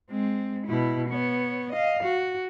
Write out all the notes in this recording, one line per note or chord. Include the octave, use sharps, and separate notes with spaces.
G#3 C4
B2 E4
B3 C#5
D#5 F5
F#4